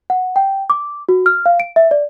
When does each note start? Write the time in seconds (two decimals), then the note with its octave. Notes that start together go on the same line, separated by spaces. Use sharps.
0.10 F#5
0.36 G5
0.70 D6
1.09 F#4
1.26 F6
1.46 F5
1.60 D7
1.76 E5
1.91 D5